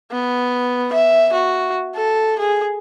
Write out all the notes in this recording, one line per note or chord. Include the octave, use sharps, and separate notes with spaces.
B3
E5
F#4
A4
G#4